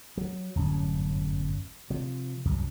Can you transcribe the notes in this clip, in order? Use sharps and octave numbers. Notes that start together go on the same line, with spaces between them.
F#3
D1 G1 F#2 C#4
C3 F3
C2 F#2